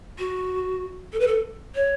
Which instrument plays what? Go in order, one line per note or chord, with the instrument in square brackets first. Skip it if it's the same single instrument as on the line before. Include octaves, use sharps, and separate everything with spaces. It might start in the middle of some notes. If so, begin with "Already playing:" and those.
[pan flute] F#4
A4
B4
A4
C#5